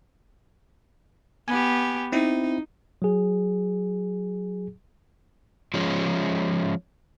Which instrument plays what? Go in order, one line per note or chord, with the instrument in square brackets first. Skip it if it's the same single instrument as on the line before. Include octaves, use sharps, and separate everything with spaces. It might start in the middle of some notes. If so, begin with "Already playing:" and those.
[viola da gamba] B3 G4 [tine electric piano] G#5
[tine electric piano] C4 E4 [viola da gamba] D#4
[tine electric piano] F#3 G#4
[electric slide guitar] F3 G#3 C#4